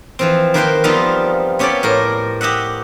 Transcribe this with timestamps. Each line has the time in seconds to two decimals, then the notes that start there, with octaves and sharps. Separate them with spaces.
0.19 E3 F3 C4
0.54 D#3 A#3 B4 C5 G5 C6
0.84 F3 G3 B3 C4 D#4 F4
1.59 B3 C#4 G4 A4 C#5 D5
1.83 A2 A#4 C5
2.41 G4 D#5 E5 F#5